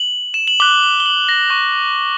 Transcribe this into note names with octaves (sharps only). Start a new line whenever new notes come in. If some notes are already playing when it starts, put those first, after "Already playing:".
Already playing: F#7
E7
F#7
D6 F#6 G7
G7
G7
F#7
A#6
C#6 F#6